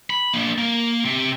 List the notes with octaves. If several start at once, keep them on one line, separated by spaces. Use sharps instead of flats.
B5
A#3 D4
A#3
C3